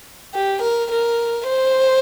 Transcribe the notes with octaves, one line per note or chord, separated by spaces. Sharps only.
G4
A#4
A#4
C5